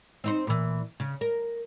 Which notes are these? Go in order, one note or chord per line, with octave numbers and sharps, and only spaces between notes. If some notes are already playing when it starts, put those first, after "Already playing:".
C4 D#4 C5
A#2 E3
C#3
A#4